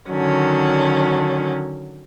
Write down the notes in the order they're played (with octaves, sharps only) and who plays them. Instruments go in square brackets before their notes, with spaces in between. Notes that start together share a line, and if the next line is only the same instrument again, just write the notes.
[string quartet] D3 D#3 F#3 C#4